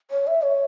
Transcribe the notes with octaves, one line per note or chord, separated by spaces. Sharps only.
C#5
E5
C#5